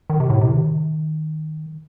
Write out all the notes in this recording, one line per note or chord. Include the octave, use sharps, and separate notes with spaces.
D#3
C3
A2
C3
D#3